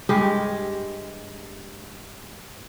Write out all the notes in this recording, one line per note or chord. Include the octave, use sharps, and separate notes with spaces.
G2 G#3 G4